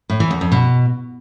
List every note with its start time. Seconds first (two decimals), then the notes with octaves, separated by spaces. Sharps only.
0.10 A2
0.20 E3
0.31 E2
0.41 F2
0.52 B2